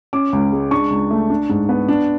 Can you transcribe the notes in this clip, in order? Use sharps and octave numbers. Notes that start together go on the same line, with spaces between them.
C#4 D6
C#2
G#3
D4 C#6
C#2
A3
D4
G#2
B3
D4